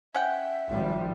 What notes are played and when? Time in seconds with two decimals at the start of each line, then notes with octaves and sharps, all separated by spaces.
0.14 C#4 E5 F#5 G5
0.70 G#1 F3 G3